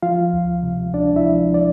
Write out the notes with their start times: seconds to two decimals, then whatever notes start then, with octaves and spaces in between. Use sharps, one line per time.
0.03 F3 F4 F5
0.33 D2
0.63 C3
0.94 D2 D4 D5
1.16 E4 E5
1.25 F3
1.54 D5